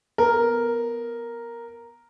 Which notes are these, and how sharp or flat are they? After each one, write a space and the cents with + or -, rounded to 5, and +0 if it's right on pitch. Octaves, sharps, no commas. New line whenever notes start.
B3 +0 A#4 +0